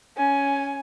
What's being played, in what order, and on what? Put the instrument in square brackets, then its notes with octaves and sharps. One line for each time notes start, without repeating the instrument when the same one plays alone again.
[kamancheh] C#4 G#5